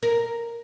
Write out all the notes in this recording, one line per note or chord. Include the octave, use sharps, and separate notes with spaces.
A#4